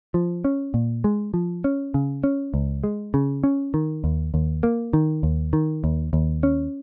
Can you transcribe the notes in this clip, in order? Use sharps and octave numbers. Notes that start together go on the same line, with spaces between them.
F3
C#4
A#2
G#3
F3
C#4
C#3
C#4
C#2
G#3
C#3
C#4
D#3
D#2
D#2
A#3
D#3
D#2
D#3
D#2
D#2
C#4